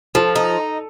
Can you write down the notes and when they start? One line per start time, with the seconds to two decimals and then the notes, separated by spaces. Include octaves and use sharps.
0.15 F3 A4
0.36 D#4